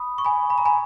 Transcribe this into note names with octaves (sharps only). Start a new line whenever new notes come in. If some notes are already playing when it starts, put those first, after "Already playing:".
Already playing: B5 D#6
C#6
G#5 B5
B5
A#5
G#5 B5